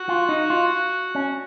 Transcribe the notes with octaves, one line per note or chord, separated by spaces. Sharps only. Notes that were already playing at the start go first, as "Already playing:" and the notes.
Already playing: F#4
F4
D#4
F4
C#4